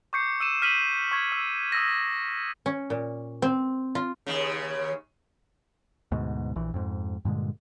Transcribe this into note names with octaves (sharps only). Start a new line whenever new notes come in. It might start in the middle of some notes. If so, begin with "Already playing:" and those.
C#6 D6 G6 C7 C#7
E6 D#7 E7
F6 B6 D#7 E7 F#7
C#6 G#6
E6
D#6 E6 A#6
C#4
A#2
C4
F4
D#2 C#3
D2 G#2 B2
A#1 E3
F2 G#2
G2 A#2 D3 G#3